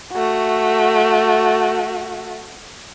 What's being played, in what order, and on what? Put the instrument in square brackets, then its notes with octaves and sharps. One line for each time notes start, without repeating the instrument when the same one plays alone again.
[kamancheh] A3 F#4